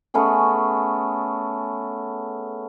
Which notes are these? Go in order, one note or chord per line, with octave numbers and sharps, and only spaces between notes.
A3 B3 C#4 G#4